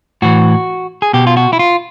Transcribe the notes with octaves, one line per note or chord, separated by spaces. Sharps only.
A2 E3 F#4
G#4
B2 G4
F4
F#4
E4
F4